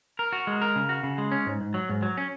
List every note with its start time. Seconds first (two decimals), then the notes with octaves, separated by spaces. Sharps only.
0.19 A#4
0.33 F#4
0.47 G#3
0.62 A#4
0.76 C#3
0.89 F#4
1.04 C#3
1.18 G#3
1.32 C#4
1.46 G#2
1.61 G#2
1.74 F#3
1.89 G#2
2.03 F#3
2.18 C#4